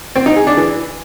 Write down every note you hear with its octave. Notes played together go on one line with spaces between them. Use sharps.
C4
D#4
G#4
D4
E3